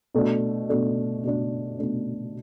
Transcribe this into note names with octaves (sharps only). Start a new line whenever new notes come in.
B2 A3 D4
B2 A3 D4
B2 A3 D4
B2 A3 D4